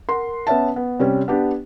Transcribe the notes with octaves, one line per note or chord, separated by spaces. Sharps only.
A#4 F#5 C6
B3 C#4 E5 A5
B3
C3 G3 C#4
B3 D4 G4